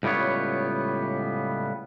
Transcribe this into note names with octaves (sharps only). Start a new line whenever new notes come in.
C#2 A2 G3 B3 C#5